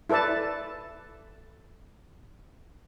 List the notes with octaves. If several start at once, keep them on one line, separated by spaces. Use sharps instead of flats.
E4 A4 B4 D5 A5